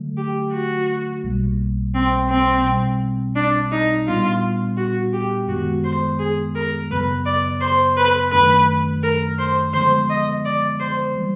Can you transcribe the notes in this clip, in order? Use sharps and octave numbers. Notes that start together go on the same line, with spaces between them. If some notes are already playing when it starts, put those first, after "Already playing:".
Already playing: D3 F#3 A3
G4
F#4
B1 B2 G3 A#3
C4
C4
B2 G3 C4
D4
D#4
A#2 G3 B3 D4 F4
F#4
G4
F#2 D#3 G#3 B3 F#4
C5
G#4
A#4
F#2 C#3 F#3 B3 B4
D5
C5
B4
F#2 D#3 F#3 A3 D4 B4
A#4
C5
D3 F3 G#3 B3 C5
D#5
D5
C5
E3 G3 A#3